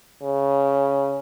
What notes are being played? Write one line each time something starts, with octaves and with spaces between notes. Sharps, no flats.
C#3